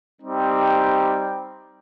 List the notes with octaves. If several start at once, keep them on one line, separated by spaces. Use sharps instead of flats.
G3 C4 D#4 G4